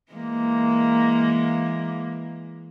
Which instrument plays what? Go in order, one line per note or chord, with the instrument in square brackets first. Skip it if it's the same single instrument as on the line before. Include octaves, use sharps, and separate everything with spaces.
[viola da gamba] E3 G#3 A#3